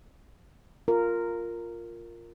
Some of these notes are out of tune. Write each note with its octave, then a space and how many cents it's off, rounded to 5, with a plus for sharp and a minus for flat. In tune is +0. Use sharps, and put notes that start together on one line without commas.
F4 +0 A#4 -10